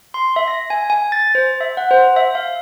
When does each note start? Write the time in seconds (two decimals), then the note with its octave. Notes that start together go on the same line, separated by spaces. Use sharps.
0.14 C6
0.36 E5
0.48 A#6
0.70 G#5
0.90 G#5
1.12 A6
1.35 C5
1.60 E5
1.77 F#5
1.91 C5
2.16 E5
2.35 F5